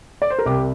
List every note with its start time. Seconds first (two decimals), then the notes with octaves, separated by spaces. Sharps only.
0.22 D5
0.30 C5
0.39 A#4
0.46 C2 G4